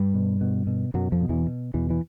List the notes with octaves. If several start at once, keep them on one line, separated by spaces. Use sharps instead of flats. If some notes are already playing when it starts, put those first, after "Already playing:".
Already playing: G2 G3
B2
B2
B2
F#2 B2 F#3
F2 F3
B2
E2 E3
B2
E2 B2 E3
E3